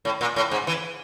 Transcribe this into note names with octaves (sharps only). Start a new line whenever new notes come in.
A2
A#2
A2
G#2
E3